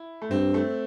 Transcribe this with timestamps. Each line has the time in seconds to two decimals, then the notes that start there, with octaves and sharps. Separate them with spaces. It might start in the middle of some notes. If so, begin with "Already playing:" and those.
Already playing: E4
0.22 A3
0.31 G2 C4
0.54 A3